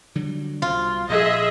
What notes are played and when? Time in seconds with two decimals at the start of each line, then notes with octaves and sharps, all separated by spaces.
0.15 D3 F#3 G3
0.62 C2 B2 F4
1.09 A#1 G#4 D#5 E5